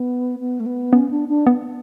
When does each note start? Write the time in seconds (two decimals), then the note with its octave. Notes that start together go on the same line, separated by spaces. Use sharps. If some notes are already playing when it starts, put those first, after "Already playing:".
Already playing: B3
0.40 B3
0.60 A3
0.66 B3
0.93 B3 C#4
1.11 D4
1.29 D4
1.47 B3